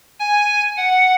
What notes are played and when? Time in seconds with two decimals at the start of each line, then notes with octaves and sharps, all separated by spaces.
0.20 G#5
0.77 F#5